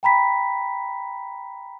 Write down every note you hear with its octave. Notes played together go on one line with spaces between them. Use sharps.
G5 A#5 B5 B6